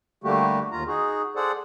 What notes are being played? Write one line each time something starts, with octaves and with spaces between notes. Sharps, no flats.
D3 G3 A3 A#3 F#4 G4
D#2 F4 A#5
D#4 F#4 G#4
G#4 A4 C5 D5 F#5